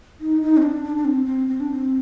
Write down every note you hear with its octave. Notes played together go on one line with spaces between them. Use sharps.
D#4
D#4
C4
D4
D4
D4
C4
C4
C4
D4
C4